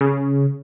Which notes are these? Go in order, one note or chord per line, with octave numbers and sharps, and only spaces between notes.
C#3